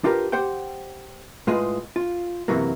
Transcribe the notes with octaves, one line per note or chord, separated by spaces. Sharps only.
D4 F4 G4 A#4 B4
G4 C5 F#5 G5
A2 G#3 F4 G#4 B4
F4
F#2 C3 E3 F#3 A#3